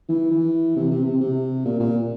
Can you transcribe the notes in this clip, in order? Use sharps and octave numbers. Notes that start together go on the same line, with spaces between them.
E3
E3
C3
C3
C3
C3
A#2
A#2